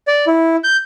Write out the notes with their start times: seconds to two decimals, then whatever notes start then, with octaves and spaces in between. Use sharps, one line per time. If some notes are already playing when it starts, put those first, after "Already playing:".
0.08 D5
0.27 E4
0.64 G6